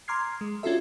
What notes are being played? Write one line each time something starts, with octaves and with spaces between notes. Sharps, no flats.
A#5 C6 D6 F6 G#6 C7
G#3
C#4 D4 F4 F#4 A4 E5